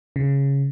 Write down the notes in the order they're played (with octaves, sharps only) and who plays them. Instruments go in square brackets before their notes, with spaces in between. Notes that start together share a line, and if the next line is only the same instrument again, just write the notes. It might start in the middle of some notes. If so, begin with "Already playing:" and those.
[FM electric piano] C#3